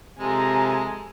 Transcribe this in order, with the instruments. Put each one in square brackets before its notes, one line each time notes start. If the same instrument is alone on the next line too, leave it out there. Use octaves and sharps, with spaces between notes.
[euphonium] C3 [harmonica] F3 G#3 A4 [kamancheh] G#5 A#5